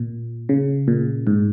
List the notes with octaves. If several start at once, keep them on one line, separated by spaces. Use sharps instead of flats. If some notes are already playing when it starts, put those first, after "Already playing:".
Already playing: A#2
C#3
A#2
G#2